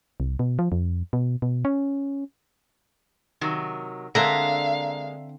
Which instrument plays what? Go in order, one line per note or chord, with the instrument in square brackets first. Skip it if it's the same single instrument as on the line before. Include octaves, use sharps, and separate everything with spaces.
[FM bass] C2
B2
F3
F2
B2
B2
C#4
[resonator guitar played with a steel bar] C3 D#3 F#3
[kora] D3 C4 D4 [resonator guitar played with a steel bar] G#3 A#3 [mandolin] E5 A#5 [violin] F5